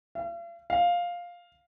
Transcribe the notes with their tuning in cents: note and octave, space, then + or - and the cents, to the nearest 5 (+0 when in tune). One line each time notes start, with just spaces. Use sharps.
F5 -45
F5 +5